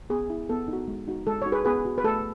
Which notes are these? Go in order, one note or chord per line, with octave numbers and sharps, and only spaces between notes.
B3 G#4
E4
B3 A4
D#4 F#4
G#3
D#4 F#4
G#3 A4
D#4 F#4 C#5
G#4 B4
B3 G#4 B4
F#4
B4
A3 A4